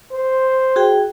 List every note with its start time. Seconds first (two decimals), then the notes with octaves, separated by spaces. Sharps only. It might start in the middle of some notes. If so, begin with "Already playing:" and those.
0.12 C5
0.76 F#4 G#4 G5